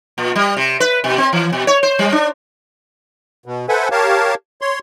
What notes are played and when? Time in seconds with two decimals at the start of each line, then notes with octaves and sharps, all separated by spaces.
0.18 A#2
0.36 G3
0.57 C3
0.80 B4
1.04 B2
1.18 C4
1.33 E3
1.53 B2
1.67 C#5
1.83 C5
1.99 G3
2.12 D4
3.46 B2
3.69 A4 B4 C5 E5 F#5 G#5
3.91 G4 A#4 C#5 F5 A5
4.61 C#5 C6